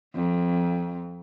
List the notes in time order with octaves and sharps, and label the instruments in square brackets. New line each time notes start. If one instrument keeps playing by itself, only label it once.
[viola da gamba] F2